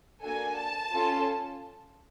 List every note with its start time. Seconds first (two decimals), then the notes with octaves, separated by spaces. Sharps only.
0.22 A#3 D4 F#4 A4 G#5
0.57 A5
0.94 C#4 F4 A4